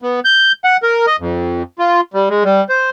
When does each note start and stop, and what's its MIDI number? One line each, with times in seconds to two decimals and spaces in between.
0.02 0.20 59
0.25 0.52 91
0.64 0.77 78
0.83 1.06 70
1.07 1.16 75
1.20 1.63 41
1.79 2.01 65
2.14 2.29 55
2.29 2.44 56
2.44 2.64 55
2.69 2.90 72